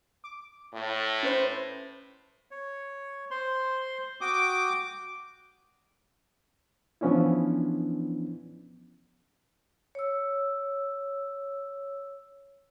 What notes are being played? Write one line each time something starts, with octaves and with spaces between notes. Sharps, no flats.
D6
A2
C#4 B4 C5
C#5
C5 C6
F#4 G5 D6 D#6
E3 F3 B3 C#4 D4 E4
C#5 E6